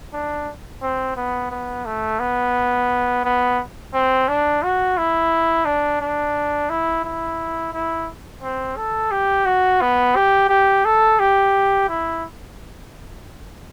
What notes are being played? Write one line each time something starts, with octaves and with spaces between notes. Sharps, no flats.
D4
C4
B3
B3
A3
B3
B3
C4
D4
F#4
E4
D4
D4
E4
E4
E4
C4
A4
G4
F#4
B3
G4
G4
A4
G4
E4